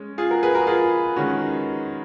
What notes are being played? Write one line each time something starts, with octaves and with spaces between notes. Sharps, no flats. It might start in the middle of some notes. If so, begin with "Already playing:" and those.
Already playing: G#3 C#4
F4 G#4
F#4 A#4
G#4 B4
F#4 A#4
F4 G#4
D#3 G#3 C#4 F#4